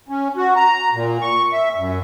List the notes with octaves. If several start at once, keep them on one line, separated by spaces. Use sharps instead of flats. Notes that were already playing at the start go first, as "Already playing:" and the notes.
C#4
F#4
A#5
A#2
C#6
E5
F#2